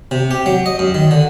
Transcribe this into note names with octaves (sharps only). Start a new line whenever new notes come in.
C3
G4
F#3
D#5
F#2
D#3
D3